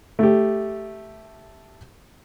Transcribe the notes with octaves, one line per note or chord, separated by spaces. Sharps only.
A3 G4